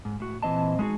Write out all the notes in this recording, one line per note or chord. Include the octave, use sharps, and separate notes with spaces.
G#2
A2 F#4
A#2 E3 C4 D#5 A5
G#3 A3 D#4 F#4 G#4